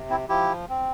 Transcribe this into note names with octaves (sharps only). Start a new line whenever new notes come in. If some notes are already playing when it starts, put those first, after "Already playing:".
Already playing: C3
C4 E4
F3 E4 G4
C4